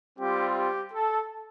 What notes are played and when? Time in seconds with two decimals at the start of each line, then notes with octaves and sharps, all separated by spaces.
0.19 G3 C4 F4 G4
0.56 G4
0.94 A4